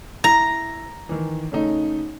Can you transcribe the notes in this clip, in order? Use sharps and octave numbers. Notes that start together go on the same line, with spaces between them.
E4 A#5
D#3 E3
C#3 A3 D#4